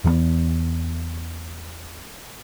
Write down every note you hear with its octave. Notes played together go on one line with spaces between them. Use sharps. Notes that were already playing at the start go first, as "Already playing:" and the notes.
E2 E3 F#3 B3